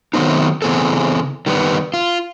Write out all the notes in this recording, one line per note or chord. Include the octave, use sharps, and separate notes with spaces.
D#3 F#3 A3 B3 C4 D#4
C#3 E3 B3 C4 G#4 A4
D#3 G3 A#3 B3
F4